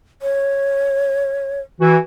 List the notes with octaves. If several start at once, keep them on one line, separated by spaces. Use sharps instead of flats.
C#5
E3 F#4